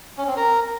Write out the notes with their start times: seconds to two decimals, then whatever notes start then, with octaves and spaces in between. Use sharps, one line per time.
0.18 C#4
0.27 C4
0.36 A#4